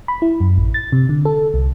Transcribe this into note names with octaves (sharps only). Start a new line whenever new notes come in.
B5
E4
F#2
A1
A6
C3
D3
A4
C2